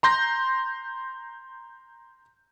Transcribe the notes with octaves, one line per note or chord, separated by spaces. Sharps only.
A#5 C6 G6 A#6